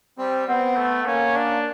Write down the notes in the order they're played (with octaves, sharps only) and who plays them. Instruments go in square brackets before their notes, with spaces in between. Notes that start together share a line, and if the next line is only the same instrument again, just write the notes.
[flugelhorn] G3 [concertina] C4
[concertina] B3 [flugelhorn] C4
[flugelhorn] A3
[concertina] A#3 [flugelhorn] C#4
[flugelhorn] D4